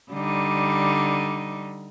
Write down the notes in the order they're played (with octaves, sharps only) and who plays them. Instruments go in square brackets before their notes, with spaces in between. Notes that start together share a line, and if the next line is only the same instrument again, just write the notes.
[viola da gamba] D3 G3 D#4